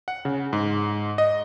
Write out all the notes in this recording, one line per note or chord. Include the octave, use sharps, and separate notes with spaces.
F#5
C#3
G#2
D#5